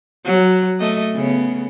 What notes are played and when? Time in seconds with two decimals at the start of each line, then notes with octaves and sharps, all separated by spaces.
0.24 F#3
0.80 A3 D#5
1.13 C#3 B3